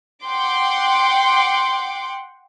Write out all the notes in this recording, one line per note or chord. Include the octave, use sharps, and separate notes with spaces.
F#5 G5 C6 D6